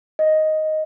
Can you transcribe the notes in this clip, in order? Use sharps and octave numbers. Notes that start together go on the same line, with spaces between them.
D#5